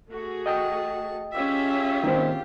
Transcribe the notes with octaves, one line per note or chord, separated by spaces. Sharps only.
A3 F#4 G#4
D#5 G5 A5 D#6
C#4 F4 G4 G#4 E5
D#3 A#3 C4